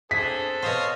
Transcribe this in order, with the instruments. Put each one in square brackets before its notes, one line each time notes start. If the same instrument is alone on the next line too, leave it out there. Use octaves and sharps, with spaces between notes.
[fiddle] C4 A4 [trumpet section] D4 G#4 [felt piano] B6
[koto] B2 C5 [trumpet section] C#5 F5 D#6